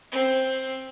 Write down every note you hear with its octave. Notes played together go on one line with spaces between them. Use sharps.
C4